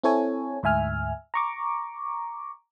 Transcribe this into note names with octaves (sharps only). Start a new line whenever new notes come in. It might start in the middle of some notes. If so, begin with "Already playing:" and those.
C4 E4 A4 C#5 G#5
D2 G#2 E5 G#5 F6
A#5 C#6 D6